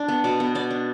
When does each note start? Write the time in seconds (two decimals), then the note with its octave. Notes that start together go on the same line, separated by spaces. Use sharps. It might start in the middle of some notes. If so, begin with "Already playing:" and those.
Already playing: D4
0.08 B3
0.24 B2 D5
0.40 B3
0.55 B3 D5
0.70 D4